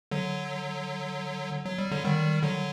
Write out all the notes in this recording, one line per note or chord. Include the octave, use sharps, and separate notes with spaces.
D3 F#3
F#3
G3
D3 F#3
D#3 G3
D3 F#3